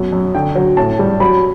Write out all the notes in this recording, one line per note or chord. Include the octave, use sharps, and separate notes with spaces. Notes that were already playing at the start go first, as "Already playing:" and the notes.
Already playing: F#2 B2
F#2
D3 G5
F#3
A2 A5
G3
F#3 B5